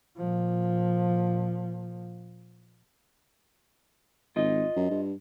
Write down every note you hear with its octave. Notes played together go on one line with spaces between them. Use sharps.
A#2 F3
G#1 F4 D#5
F#2
G2